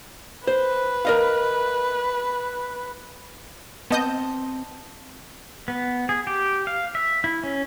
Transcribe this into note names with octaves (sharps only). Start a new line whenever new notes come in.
B4 C5
A#4 D#5 F5
B3 C4 D#5 A5 G6
B3
G#4
G4
F5
E5
E4
C#4